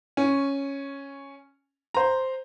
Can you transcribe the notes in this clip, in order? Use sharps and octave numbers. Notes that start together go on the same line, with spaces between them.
C#4
C5 A#5